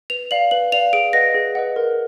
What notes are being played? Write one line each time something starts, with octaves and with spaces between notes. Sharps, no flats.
B4 F7
D5 F5 F#7
B4 F#7
D5 F5 F7
G#4 D7
B4 D#5 F#5 A#6
G#4
B4 D#5 F#5
A#4